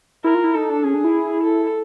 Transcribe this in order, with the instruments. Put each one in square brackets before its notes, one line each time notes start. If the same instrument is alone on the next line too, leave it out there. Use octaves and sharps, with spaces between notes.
[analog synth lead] E4 [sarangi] A#4
[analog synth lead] F4
E4
[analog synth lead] D#4 [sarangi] A4
[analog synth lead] D4
[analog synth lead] C#4 [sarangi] G#4
[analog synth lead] D4
E4
[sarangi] A4